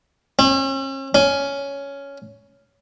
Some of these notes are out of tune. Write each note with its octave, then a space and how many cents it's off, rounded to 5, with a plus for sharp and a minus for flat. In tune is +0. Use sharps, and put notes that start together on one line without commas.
C#4 -40
C#4 +10